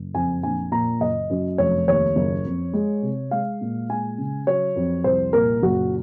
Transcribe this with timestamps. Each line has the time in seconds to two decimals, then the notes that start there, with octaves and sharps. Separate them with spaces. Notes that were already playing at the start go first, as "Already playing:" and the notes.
Already playing: F#1
0.14 F2 G#5
0.43 A#1 G#5
0.72 A#2 A#5
1.00 F#1 D#5
1.30 F#2
1.58 F1 C#5
1.88 D#2 C#5
2.16 F#1
2.45 F2
2.74 G#3
3.02 C3
3.31 G#3 F5
3.61 A#2
3.89 G#3 G#5
4.18 C#3
4.47 F#3 C#5
4.76 F2
5.04 C2 C5
5.33 A#2 A#4
5.62 F#1 F#4